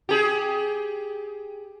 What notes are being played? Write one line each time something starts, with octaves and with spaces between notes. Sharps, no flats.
G4 G#4